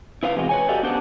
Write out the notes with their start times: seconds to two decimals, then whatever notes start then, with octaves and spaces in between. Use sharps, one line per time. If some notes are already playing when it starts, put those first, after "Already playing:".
0.23 E4 B4 C5 F5
0.36 E2 C3 G#3 F4 F#4
0.49 B4 C#5 G#5
0.68 F#4 G4 A4 D5 D#5 F5
0.83 B3 C#4 D4 G4 C5 F#5